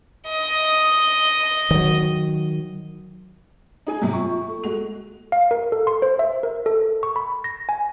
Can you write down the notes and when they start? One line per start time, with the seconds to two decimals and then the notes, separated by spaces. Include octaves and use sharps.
0.30 D#5
1.71 D#3 F#3
3.87 D#4 G#4 G#5
4.02 F#2 C3 F#3 G4
4.13 F4 C#6
4.48 A4
4.64 G#3 F#4 F7
5.32 F5
5.51 A#4
5.72 A4
5.87 C6
6.02 C5
6.19 E5
6.43 A#4
6.66 A4
7.03 C#6
7.16 B5
7.44 A#6
7.69 G#5